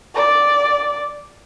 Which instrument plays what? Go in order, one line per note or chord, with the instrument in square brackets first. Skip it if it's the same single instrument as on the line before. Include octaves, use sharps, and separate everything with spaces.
[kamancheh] D5